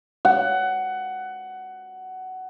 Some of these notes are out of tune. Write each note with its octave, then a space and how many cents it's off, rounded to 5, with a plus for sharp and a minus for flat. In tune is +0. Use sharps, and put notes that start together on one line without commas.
F#5 +15